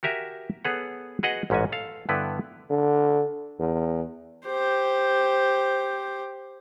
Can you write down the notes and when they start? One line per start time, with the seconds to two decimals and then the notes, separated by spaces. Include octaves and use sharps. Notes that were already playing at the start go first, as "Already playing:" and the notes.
0.03 F#4 G4 A#4 E5 G#5
0.65 B3 G#4 A4 B4 C#5 F#5
1.23 F#4 G#4 B4 D#5 F#5
1.50 A1 G#2 C#4 F#4 G#5
1.72 A4 F5
2.09 G2 D3 B3 E4 A4 B4
2.70 D3
3.59 E2
4.46 G4 C5